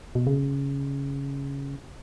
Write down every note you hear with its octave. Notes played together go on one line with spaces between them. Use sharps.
B2
C#3